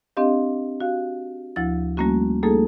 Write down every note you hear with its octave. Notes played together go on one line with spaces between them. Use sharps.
C4 D4 G4 D#5 F5
F#4 F5
D2 F3 E4 A6
G3 A3 A#3 C#4 F#4
G3 A3 A#3 D#4 G#4 A4